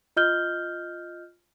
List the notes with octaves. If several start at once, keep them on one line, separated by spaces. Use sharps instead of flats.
F4 D#5 F6 G6 G7